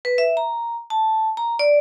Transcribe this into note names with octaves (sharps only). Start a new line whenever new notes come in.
B4
E5
A#5
A5
A#5
D5